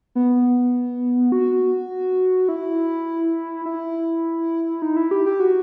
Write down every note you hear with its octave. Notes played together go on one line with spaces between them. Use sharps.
B3
F#4
E4
E4
D#4
E4
G4
G4
F#4